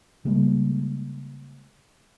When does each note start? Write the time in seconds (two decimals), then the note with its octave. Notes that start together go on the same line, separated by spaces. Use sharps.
0.25 C#3 G3 G#3 A#3